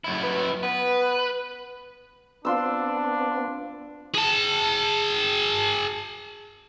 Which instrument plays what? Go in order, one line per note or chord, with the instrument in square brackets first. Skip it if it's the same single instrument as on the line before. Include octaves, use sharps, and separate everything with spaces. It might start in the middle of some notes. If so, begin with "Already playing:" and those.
[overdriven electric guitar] F#2 E4
[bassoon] B4
[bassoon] B3 [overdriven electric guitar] B4
[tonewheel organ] B3 C4 [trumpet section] D4 [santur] F4 C6 E6
[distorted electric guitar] G#4 A5